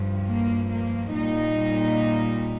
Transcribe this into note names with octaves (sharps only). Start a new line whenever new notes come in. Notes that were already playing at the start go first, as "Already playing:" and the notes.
Already playing: G2 F3
A#3
A#3
A#2 G3 D#4